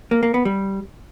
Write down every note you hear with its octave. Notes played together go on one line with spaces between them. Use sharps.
A#3
A#3
B3
G3